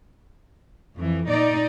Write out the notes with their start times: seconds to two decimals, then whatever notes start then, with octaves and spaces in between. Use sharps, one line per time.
0.95 F2 E3
1.29 A#2 D#4 D5